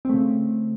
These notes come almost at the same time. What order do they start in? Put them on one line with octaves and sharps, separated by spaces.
C4 A3 C#3